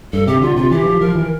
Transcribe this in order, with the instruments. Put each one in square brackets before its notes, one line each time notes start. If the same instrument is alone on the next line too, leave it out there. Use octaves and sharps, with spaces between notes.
[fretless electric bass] G2 [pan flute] A4
[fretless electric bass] C3 [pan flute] G4
[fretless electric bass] D3 [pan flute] F4
[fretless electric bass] C3 [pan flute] F4
[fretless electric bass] E3 [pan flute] G4
[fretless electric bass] F3
[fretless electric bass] F3 [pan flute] A#4
[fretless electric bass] E3